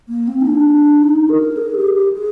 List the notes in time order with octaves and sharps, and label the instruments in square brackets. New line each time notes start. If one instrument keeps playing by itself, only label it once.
[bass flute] A#3
C4
D#4
D4
D#4
A#4
G#4
G4
G4
G#4